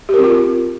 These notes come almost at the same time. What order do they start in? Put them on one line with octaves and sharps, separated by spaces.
G4 A#4 C4 F4